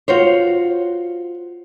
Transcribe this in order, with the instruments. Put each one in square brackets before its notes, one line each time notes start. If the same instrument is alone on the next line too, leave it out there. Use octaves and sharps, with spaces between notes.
[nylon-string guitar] F4 F#4 C5 C#5